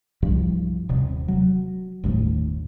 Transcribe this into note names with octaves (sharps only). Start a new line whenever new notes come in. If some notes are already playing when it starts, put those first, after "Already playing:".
C2 G2 F3
D#1 C3
F#3
G1 D#2 A2